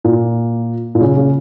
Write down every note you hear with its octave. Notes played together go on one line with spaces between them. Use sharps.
A#2
A#2
C#3
C#3